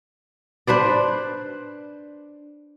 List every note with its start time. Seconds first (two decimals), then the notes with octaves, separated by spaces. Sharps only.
0.67 D4 B4 C5 D5